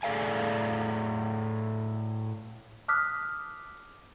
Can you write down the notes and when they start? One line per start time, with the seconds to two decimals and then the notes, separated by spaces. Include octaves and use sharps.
0.03 A2 G#4 A4 D5 F5 G#5
2.88 A5 D6 D#6 F6 F#6 B6